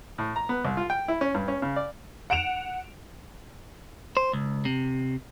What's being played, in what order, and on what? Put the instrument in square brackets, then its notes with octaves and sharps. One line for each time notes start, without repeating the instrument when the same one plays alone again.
[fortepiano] A2
A#5
B3
C2
F4
G5
E4
C#4
G2
C#4
C#3
D5
[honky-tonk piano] F#5 D7 E7 F7
[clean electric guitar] C5
C#2
C3